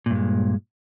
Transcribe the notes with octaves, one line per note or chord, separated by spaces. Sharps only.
G2 A#2 G#3